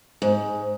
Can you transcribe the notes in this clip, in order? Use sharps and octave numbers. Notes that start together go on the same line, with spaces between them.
G#2